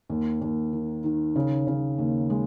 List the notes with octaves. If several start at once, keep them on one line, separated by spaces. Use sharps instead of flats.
D#2
D#2
D#3
D#3
C#3
C#3
D#2
G#3